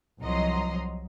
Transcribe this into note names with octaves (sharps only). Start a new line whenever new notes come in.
C2 F3 F#3 D#5 A#5 C6